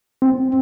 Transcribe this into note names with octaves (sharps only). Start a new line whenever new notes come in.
C4